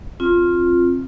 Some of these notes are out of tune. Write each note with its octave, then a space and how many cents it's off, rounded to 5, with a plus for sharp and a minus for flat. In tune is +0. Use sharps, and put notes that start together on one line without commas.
C4 +25 F4 +0